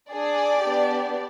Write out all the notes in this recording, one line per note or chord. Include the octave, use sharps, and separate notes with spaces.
D4 G#4 D5
B3 D4 G4